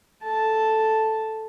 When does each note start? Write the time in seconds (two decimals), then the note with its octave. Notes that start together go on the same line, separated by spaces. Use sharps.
0.23 A4 A5